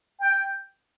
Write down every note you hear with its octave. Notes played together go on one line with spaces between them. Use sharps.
G5